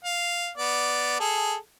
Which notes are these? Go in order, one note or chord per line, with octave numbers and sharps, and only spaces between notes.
F5
B3 D5
G#4 A4